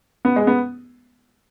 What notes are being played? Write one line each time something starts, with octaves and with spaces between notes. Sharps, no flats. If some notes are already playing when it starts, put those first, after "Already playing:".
B3
G#3
B3